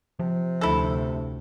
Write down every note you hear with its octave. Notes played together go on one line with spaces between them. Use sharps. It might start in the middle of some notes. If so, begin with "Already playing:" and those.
C3 F3
F1 D2 E4 A4